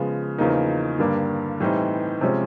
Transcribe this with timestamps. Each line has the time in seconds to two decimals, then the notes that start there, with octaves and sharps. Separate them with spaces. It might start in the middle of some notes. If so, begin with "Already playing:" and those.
Already playing: C#3 F3 G#3 B3
0.38 E2 C#3 F3 A#3 D#4
0.99 G2 D3 G3 A#3 D4
1.60 A2 E3 G3 C4 D#4
2.21 C3 F3 G#3 C#4